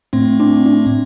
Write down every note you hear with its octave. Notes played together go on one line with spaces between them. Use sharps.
A2 A3 C4
C4 D4
C4 D4